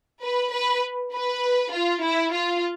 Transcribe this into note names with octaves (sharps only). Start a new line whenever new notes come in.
B4
B4
B4
F4
E4
F4